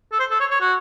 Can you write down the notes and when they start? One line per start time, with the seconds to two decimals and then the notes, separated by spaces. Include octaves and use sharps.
0.12 A4
0.20 C5
0.31 A4
0.40 C#5
0.51 C#5
0.61 F#4